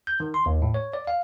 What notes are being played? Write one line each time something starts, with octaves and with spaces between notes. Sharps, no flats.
G6
D#3
C6
D#2
A2
C#5
D5
F5